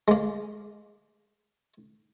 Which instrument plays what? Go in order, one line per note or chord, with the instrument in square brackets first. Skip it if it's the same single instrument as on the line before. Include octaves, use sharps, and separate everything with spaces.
[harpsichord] G#3 A#3